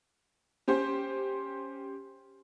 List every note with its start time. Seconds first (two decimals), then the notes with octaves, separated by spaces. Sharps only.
0.68 C#4 G4 C5